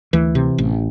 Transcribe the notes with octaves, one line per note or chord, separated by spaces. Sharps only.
D2 E3
C3
A1